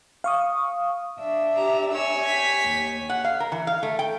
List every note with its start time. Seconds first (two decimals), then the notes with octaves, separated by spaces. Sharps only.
0.24 F5 C#6 D#6
1.20 D4 E5
1.57 G4 A#5
1.93 C#5 G#5 E6
2.24 G4 B6
2.65 D#2
3.09 F#5
3.24 F5
3.40 A#4
3.52 E3
3.67 F5
3.83 A3
3.99 G5